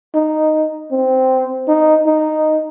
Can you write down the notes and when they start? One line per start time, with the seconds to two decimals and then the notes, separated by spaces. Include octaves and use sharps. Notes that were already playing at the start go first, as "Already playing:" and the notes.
0.15 D#4
0.91 C4
1.68 D#4
2.06 D#4